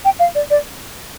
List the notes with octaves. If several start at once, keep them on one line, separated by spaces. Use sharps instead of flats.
G5
F5
D5
D5